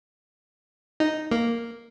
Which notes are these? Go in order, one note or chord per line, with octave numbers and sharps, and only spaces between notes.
D#4
A#3